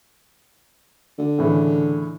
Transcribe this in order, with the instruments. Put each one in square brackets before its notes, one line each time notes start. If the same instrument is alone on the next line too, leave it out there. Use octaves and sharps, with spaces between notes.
[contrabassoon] D3
[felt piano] A2 C#3 E3